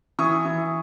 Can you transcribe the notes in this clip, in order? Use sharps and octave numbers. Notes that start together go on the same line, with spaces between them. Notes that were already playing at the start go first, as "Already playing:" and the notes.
E3 C#6 D#6
E3